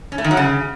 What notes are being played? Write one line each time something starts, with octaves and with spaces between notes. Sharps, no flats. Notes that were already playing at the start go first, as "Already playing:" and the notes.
C#4
A3
D#3
F#3
C#3